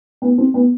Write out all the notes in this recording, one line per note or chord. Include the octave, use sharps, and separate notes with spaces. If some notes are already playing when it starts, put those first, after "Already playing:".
B3
C4
B3